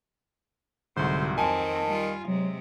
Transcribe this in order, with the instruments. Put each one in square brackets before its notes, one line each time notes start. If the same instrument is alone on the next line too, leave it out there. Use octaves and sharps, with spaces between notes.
[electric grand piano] C2 G#2 [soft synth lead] D3 [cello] F#3 F#4 [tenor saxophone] C5
[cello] F2 C4 [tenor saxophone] D#3 [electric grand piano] G#5 [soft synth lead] A5
[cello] G3 F4
[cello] C3 G#3 [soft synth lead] F#3